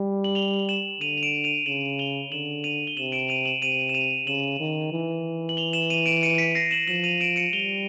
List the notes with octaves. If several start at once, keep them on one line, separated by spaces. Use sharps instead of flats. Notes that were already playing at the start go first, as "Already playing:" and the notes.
Already playing: G3
F#7
F7 G7
E7 F#7
D3 D#7 F7
F7
D7 E7
D#7 F7
C#3 E7 F#7
F7 G7
D3 E7 F#7
D#7 F7
G7
C3 E7 F#7
D7 E7
D#7 F7
E7 F#7
C3 D#7 F7
E7
D#7 F7
C#3 E7 F#7
D#3
E3
F#7
F7 G7
E7 F#7
D#7 F7
D7 E7
C#7 D#7
B6 C#7
A#6 C7
E7 F#7
F3 E7 F#7
D#7 F7
D7 E7
C#7 D#7
G3 F7 G7